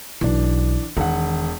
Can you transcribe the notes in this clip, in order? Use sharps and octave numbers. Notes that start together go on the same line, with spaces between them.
B1 E3 D4
E1 D#3 F#5